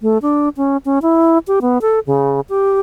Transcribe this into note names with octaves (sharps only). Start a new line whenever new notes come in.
A3
D4
C#4
C#4
E4
G4
B3
A4
C#3
G4